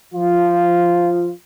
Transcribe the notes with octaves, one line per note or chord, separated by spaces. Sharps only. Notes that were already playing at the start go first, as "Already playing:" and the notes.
F3 F4